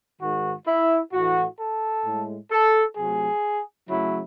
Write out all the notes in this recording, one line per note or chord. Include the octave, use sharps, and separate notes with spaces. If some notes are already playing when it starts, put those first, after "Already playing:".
G#2 D#3 G#3 F#4
E4
A2 E3 A3 F#4
A4
A2 G#3
A4
C3 F#3 A3 G#4
C#3 F#3 A3 E4